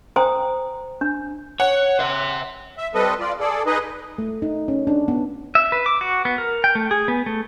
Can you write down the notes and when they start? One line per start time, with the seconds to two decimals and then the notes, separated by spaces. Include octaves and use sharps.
0.16 C5 G5 G#5 A#5 D#6
1.01 D4
1.60 C#5 F#5
1.99 C5 E5
2.78 E5
2.94 G3 C4 A4 B4 D#5
3.20 F4 D5
3.40 G#4 A4 D5
3.66 D#4 G#4 B4 D#5
4.18 A3
4.42 D#4
4.68 C#4
4.87 D4
5.08 B3
5.55 E5
5.72 B4
5.86 D6
6.01 F#4
6.25 B3
6.38 A#4
6.64 G5
6.75 A3
6.91 G#4
7.08 B3
7.26 A3